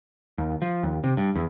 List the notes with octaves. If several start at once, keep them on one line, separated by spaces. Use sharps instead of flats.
D#2
F3
D#2
C3
G2
E2